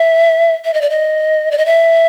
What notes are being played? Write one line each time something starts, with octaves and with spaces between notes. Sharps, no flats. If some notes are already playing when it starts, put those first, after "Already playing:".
Already playing: E5
E5
D#5
D5
D#5
D5
D#5
E5